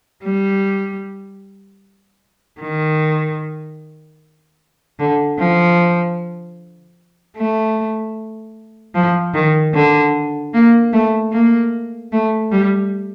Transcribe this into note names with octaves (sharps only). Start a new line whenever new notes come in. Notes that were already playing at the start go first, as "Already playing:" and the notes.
G3
D#3
D3
F3
A3
F3
D#3
D3
A#3
A3
A#3
A3
G3